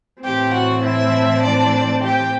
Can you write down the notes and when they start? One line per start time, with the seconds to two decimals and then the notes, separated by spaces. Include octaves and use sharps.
0.24 A2 E3 A3 C4 G4 G5
0.53 F#4 F#5
0.83 E4 E5
1.42 D4 D5
2.02 G4 G5